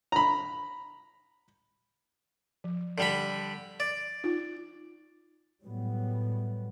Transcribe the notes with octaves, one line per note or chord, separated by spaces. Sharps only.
A#5 B5
F3
D3 G3 B5
D5
D#4 F4
A2 F#3 G3 B3